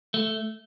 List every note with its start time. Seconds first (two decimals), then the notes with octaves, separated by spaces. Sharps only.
0.14 A3